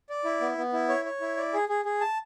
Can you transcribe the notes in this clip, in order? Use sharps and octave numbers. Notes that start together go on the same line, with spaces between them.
D5
E4
B3
B3
E4
C#5
C#5
E4
D5
G#4
G#4
G#4
A5